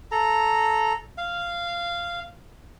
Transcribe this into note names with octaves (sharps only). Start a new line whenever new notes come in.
A4 A#5
F5